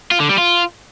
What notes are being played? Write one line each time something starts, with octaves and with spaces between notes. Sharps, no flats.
F4
D3
G3
F4